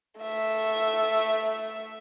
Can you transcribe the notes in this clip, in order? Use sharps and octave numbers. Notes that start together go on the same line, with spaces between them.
A3 E5